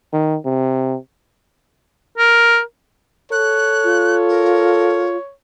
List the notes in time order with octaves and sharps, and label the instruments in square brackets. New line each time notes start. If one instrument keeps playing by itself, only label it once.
[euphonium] D#3
C3
[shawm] A#4
[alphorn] A4 [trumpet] C#5 [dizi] F#6
[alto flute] F4
[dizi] A#4